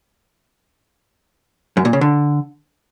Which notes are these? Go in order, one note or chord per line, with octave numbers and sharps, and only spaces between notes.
F#2
A#2
C#3
D3